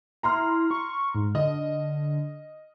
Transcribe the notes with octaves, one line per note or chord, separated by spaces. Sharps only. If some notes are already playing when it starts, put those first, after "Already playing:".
E4 A#5 C6 F6
C#6
G#2
D3 D#5